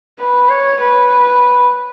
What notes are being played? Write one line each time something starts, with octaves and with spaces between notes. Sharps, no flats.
B4
C#5
B4